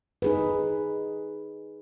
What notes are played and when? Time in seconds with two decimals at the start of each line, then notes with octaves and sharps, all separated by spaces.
0.22 D#4 G#4 B4